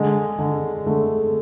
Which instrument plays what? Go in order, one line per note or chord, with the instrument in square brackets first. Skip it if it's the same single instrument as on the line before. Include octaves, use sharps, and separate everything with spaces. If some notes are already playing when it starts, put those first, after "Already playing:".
Already playing: [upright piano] D3 [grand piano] G#3
[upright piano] D3
[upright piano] D3 [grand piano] A3